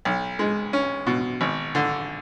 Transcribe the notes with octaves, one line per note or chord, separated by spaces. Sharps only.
B1
G#3
C#4
B2
G#1
D3